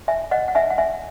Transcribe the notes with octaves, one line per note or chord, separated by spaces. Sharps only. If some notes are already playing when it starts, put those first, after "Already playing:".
E5 G#5
D#5 F#5
F#5
E5 G#5
F#5
E5 G#5